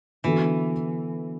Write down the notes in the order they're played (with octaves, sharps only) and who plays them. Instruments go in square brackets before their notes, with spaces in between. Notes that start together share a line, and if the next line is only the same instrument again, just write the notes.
[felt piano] D3 B3 F#4 A4 [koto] E3